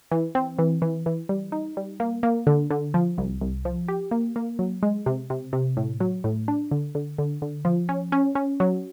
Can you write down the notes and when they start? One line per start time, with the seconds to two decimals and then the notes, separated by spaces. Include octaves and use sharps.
0.11 E3
0.35 C4
0.59 E3
0.82 E3
1.06 E3
1.29 G3
1.52 D#4
1.77 G3
2.00 A#3
2.23 A#3
2.47 D3
2.71 D3
2.94 F3
3.18 C2
3.41 C2
3.65 F3
3.88 G4
4.11 A#3
4.36 A#3
4.59 F#3
4.83 G#3
5.06 C3
5.30 C3
5.53 C3
5.77 A2
6.00 F#3
6.24 A2
6.48 D4
6.71 D3
6.95 D3
7.18 D3
7.42 D3
7.65 F3
7.89 C#4
8.12 C#4
8.35 C#4
8.60 F#3